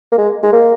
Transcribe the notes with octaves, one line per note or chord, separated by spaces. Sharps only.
A#3
G#3
G#3
A#3